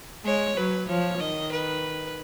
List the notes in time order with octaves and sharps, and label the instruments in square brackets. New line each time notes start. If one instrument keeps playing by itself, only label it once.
[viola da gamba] G#3 [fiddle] C#5
[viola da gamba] F#3 [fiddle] B4
[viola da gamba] F3 [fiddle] C#5
[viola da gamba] D#3 [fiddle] D#5
[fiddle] B4